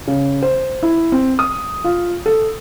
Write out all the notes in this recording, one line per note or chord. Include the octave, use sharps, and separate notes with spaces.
C#3
C5
E4
C4
D#6
F4
A4